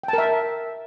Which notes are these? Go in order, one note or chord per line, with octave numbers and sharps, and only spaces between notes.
A#4 E5 G5 A5